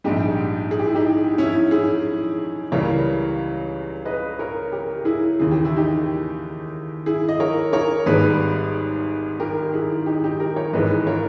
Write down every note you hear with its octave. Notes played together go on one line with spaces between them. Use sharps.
A#1 G#2 G3 D#4 G4
G#4
G4
E4
D#4 G4
C#4 E4
E4 G#4
C#2 C#3 E3 G3 A#4 C#5
B4 D#5
A#4 C#5
G4 A#4
E4 G#4
D#2 C#3 E3 G#4
G4
E4
D#4 G4
E4 G#4
D#5
A#4 C#5
A#4 C#5
G#1 G#2 G3 G#4 B4
G4 A#4
E4 G#4
D#4 G4
D#4 G4
G4 A#4
A#4 C#5
G#1 G#2 E3 G#3 B4 D#5
A#4 C#5